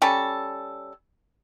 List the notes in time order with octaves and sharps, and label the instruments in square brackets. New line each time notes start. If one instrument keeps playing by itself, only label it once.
[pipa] G3 C#4 A4